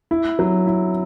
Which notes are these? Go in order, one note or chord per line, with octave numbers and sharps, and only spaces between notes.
E4
F#3
E4